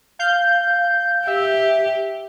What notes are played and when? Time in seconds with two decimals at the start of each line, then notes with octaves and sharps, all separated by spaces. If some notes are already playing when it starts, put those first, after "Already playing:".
0.19 F5 G6
1.27 G4 E5